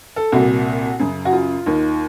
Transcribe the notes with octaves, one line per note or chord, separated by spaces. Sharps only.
A4
C2 A#2 F#4
F#2 C#3
F#4
F4
D#2 D#3